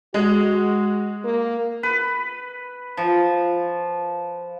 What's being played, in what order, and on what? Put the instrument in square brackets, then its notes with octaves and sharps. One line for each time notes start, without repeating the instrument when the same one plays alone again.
[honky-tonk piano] G#3 [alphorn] F#4
[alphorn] A#3
[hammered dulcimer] B4
F3